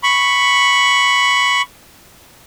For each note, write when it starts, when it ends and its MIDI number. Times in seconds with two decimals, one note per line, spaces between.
0.03 1.62 83
0.03 1.62 85